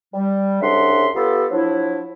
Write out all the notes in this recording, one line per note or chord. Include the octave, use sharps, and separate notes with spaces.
G3
C2 C#3 D4 E5 F#5 C6
B3 F4 G4 A4
F3 F#3 D4 E4